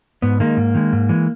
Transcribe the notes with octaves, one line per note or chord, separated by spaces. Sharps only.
G#2 B3
D#3 G#3 A#3
G#2
D#3 G#3
G#2
E3 G#3